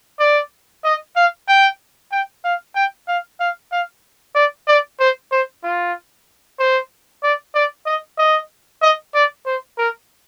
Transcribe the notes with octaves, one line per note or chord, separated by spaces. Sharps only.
D5
D#5
F5
G5
G5
F5
G5
F5
F5
F5
D5
D5
C5
C5
F4
C5
D5
D5
D#5
D#5
D#5
D5
C5
A#4